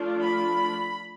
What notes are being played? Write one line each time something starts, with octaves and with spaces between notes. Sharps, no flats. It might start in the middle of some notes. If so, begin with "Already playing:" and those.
Already playing: F3 A3 D4 F4
B5